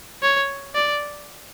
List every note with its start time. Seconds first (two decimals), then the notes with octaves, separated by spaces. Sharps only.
0.23 C#5
0.75 D5